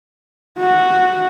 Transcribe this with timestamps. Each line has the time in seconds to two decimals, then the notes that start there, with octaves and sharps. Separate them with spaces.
0.59 F#4